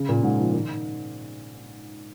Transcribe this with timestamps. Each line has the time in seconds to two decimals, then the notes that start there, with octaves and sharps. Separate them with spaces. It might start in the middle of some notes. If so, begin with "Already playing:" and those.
Already playing: C#3
0.09 A#2
0.23 G#2
0.39 F3
0.53 D#3